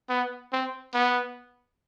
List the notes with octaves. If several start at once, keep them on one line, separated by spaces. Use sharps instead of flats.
B3
C4
B3